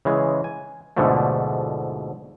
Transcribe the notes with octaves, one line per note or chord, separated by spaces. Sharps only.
C#3 E3 G#3
G#5
D2 G#2 B2 D3 F3 A3